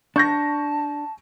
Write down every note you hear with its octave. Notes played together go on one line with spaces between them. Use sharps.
D4 A5 C#6 G6 A#6